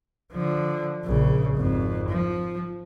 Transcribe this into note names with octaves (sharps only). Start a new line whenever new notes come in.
D3 F3
A#1 C#3
G#1 F2
F3